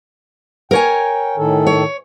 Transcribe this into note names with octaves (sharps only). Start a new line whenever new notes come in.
A#4 C#5 G5 G#5
A2 D#3 A4
C#5